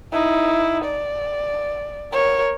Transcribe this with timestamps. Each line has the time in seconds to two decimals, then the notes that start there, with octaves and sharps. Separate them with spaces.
0.12 D#4 E4
0.85 D5
2.13 A#4 C#5